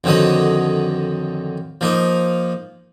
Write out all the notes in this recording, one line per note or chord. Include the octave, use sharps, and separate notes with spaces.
F2 D3 D#3 F#3 D#5
F3 A#3 D#4